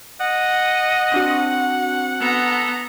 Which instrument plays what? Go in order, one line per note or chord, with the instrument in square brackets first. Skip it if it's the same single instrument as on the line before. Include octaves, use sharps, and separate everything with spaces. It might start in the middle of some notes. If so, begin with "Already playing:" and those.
[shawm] D#5 [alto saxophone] F#5
[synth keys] C4 D4 F#4
[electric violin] B3 A#5 [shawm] A4